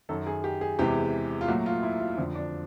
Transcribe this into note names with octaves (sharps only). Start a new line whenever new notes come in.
F#2 D#3 F#3 A4
G#4
G4
G#4
E2 C3 E3 G#3 G4
F4
A#2 F#3 A3 F#4
F4
E4
F4
F2 D3 F3
D4